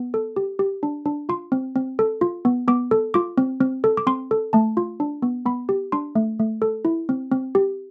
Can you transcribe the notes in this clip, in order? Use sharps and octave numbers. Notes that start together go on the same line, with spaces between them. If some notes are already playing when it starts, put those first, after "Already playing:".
Already playing: B3
A4
G4
G4
D4
D4
F4 C6
C4
C4
A4
F4
B3
B3 D6
A4
F4 D6
C4
C4
A4
D6
C4 C6
A4
A3 A5
F4
D4
B3
B3 B5
G4
D4 C6
A3
A3
A4
E4
C4
C4
G4